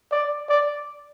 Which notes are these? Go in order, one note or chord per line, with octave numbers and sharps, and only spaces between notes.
D5
D5